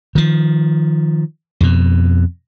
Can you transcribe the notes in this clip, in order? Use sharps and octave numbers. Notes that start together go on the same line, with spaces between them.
D#3 F3
F2 B2